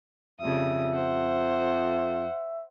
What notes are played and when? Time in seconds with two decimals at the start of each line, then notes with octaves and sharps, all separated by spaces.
0.41 F2 C#3 G3 E5 D#6
0.93 C5 F#5